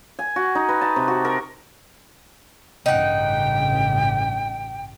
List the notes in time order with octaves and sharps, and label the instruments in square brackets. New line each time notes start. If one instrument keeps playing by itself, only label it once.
[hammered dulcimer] G#5
F#4
D#4
B4
A5
C3
F#4
A#4
[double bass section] A1 G2 C#3 [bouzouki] D#4 F#5 [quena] G5